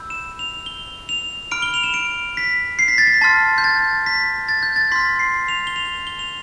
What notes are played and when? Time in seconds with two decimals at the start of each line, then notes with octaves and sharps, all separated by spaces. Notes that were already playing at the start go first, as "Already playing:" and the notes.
Already playing: B5 E6 G6
0.10 E7
0.39 F7
0.66 G7
1.09 F7
1.52 B5 F6 D7
1.62 G7
1.74 F7
1.84 E7
1.94 D7
2.37 B6
2.79 C7
2.88 B6
2.98 A6
3.07 B6
3.21 A5 C6 F6 A6
3.58 G6
3.64 A6
4.06 B6
4.49 A6
4.63 G6
4.76 A6
4.91 C6 F6 B6
5.19 C7
5.48 F7
5.67 G7
5.76 F7
6.07 G7
6.19 F7